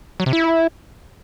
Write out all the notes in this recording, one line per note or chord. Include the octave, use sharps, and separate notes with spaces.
F#3
C3
E4